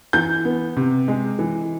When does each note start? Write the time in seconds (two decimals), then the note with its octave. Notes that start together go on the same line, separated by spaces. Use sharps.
0.13 E3 G6
0.45 B3
0.77 C3
1.08 G#3
1.39 E3